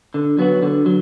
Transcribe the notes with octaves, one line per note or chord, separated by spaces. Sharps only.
D3
F#3 B3 F#4
D3
F#3